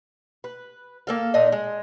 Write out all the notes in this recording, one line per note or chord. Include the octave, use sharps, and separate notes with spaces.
B4
A#3 A4 F5
A#2 D4 D#4 D#5
G#3